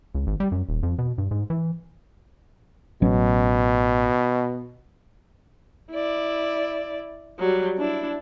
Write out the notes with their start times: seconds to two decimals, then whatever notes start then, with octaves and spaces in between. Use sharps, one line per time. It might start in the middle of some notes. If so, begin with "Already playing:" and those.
0.15 C#2
0.27 G#1
0.40 G3
0.52 F#2
0.69 D#1
0.83 F2
0.99 B2
1.18 G2
1.31 G#2
1.50 E3
3.02 A1 B2 F#3 C#4
5.91 E4 D5
7.39 F#3 G3
7.78 D4 E4